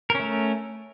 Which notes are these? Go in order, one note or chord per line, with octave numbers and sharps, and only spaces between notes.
A3 C#4 A#4